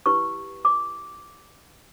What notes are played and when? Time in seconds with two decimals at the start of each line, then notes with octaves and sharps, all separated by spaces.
0.06 E4 G4 B4 C#6
0.65 D6